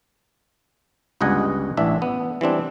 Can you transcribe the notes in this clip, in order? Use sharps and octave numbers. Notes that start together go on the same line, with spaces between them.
G1 C#2 G2 D#5 F#5 G#5
A1 E3 D4 E5
B3
E3 G3 C4 D4